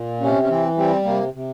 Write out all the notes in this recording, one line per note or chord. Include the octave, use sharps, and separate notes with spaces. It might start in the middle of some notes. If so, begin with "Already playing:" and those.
Already playing: A#2
C3 C#4
C#4
E3 C4
G3 C4
C3 A#3
C3